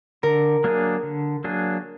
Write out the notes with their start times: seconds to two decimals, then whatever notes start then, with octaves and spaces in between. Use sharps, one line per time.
0.23 D3 A#4
0.64 F#3 A#3 D4 G#4
1.03 D3
1.44 F#3 A#3 D4 G#4